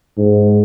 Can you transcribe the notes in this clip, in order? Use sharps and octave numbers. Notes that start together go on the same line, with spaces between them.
G#2